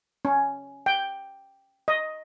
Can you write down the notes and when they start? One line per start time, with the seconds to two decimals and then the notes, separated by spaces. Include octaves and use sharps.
0.25 C#4
0.86 G5
1.88 D#5